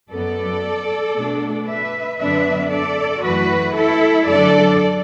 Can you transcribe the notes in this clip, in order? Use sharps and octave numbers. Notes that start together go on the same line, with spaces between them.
F#2 F#3 B3 A4 D5
B2 A3 D4
B4 E5
F#2 D3 B3 D4 B4 E5
A4 D5
F#2 E3 A3 F#4 B4
E4 A4
F#2 D3 F#3 D4 A4 D5